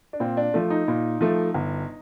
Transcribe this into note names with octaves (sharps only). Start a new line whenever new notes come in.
D4
A#2 C4
D4
F3 A3
D#4
A#2
F3 A3
G1